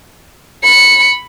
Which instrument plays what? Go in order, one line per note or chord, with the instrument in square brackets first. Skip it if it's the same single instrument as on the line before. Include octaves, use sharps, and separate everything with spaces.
[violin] B5 C#7